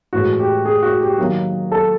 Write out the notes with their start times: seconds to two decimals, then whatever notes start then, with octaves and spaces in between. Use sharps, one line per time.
0.13 A2 E3 G#3 F#4
0.39 G4
0.65 G#4
0.83 F#4
1.01 G4
1.18 D#3 F#3 A#3
1.72 A4